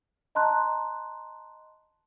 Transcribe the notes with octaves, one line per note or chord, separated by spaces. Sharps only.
D#5 A5 A#5 C6 F#6